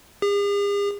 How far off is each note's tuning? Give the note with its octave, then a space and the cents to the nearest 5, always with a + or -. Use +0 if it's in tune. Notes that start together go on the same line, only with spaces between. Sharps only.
G#4 -45